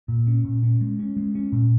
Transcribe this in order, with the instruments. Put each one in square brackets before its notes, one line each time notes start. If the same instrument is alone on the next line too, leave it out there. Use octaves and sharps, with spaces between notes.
[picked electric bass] A#2
C#4
A#2
C#4
G#3
C#4
G#3
C#4
A#2